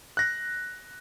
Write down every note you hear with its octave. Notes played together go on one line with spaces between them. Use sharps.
F#6 A#6